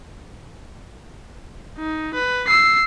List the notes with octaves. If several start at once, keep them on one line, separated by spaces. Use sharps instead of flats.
D#4
B4
E6 C7